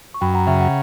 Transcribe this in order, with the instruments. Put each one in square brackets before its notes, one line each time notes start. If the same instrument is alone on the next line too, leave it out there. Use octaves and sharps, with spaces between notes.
[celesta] C#6
[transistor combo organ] F#2 [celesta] G5 B5
[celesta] F#5 A#5
[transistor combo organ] C#3 [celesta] E5 G5
[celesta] F#5